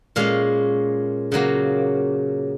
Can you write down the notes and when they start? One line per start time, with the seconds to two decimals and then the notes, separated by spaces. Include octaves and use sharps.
0.16 A#2 G#3 C#4 F5
1.32 C#3 F#3 A#3